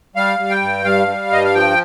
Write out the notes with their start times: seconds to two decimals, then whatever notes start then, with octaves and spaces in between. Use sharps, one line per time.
0.16 G3 F5
0.39 G3
0.50 G5
0.62 G2
0.85 G3 F5
1.08 G3
1.31 G2 D#5
1.44 F5
1.54 F3 G5